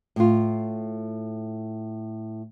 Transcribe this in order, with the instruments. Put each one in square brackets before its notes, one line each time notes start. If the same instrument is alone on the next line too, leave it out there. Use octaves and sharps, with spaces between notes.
[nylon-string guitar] A2 F4